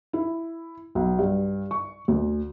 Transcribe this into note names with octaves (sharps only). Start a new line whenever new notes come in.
E4
B1
G2
C#6
D2